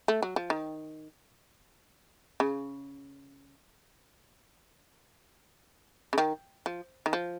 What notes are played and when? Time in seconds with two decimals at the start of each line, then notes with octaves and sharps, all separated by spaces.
0.08 A3
0.22 F#3
0.36 F3
0.50 D#3
2.40 C#3
6.13 C#3
6.18 D#3
6.66 F3
7.06 D#3
7.13 F3